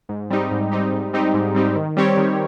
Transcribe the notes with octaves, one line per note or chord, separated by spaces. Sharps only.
G#2
G3 C4 D#4 G4
G#2
G3 C4 D#4 G4
G#2
G3 C4 D#4 G4
G#2
G3 C4 D#4 G4
D#3
G3 C4 G4 C#5
D#3